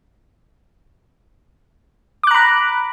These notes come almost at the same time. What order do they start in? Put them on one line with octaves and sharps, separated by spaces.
D6 F#6 A#5 B5